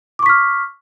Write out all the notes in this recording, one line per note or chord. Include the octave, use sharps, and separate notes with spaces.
C#6 D6 F6 B6